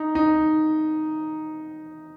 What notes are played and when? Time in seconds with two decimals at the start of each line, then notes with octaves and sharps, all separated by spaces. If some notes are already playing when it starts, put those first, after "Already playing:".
Already playing: D#4
0.15 D#4